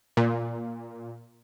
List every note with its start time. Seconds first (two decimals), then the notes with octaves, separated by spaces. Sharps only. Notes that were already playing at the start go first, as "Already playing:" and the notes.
0.17 A#2